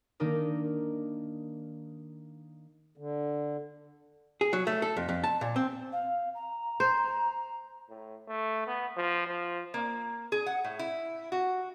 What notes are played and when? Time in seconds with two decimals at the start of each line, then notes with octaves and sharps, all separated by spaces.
0.20 D#3 A#3 D4 D#4 A#4
2.98 D3
4.41 G#4
4.53 F#3
4.67 A3
4.82 A4
4.97 F2
5.09 F2
5.24 A5
5.41 A#2
5.56 C4
5.92 F5
6.35 A#5
6.80 C5
7.89 A2
8.28 A3
8.67 B3
8.96 F3
9.27 F3
9.74 A#3
10.32 G#4
10.46 F#5
10.64 A2
10.79 E4
11.32 F#4